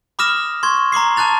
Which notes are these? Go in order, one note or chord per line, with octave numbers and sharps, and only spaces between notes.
B5 D6 D#6 F6 A#6 E7
C6 C#6 G#6
A#5 C6 D6 C7
A5 D6 F#6 A6 F7